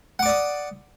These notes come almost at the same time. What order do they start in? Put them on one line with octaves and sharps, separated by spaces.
F#5 D6 D5 D#6